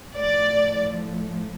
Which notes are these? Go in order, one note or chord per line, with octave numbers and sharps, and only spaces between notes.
A2 F3 D5